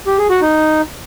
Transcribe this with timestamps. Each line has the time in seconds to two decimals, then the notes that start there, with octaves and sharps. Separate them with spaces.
0.07 G4
0.18 G#4
0.30 F#4
0.41 D#4